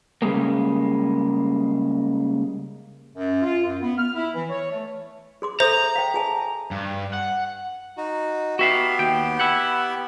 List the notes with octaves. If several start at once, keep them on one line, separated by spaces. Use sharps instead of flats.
C#3 G3 G#3 A#3
F#2
F4
F#2
B3
F6
E4
E3
C#5
A3
G#4 C6 D6
A4 C5 E5 A#5
F5 G5
G#4 G#5 A5
G2
F#5
D#4 F#4
B3 F#4 G4 E5 F5
D#2 G5
E4 F#5